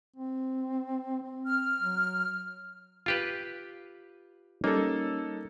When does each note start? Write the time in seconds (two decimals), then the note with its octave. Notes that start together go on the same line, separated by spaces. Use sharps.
0.16 C4
1.22 C4
1.47 F6
1.81 F#3
3.06 F4 G4 B4
4.64 G3 A#3 C#4 D#4 A4